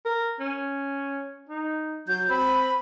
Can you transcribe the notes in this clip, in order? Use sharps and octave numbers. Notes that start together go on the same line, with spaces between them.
A#4
C#4
D#4
F#3 G6
C4 B5